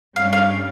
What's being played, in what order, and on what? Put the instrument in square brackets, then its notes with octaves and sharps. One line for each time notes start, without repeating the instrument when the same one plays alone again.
[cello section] G2 G3 C#4 [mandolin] F5
[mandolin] F5